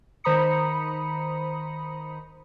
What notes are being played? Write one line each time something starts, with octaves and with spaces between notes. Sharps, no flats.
D#3 C5 A#5 B5 D#6 C#7